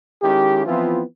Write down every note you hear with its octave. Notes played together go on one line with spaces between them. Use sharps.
D#3 G#3 C#4 E4 G4
E3 F3 B3 C4 E4 F4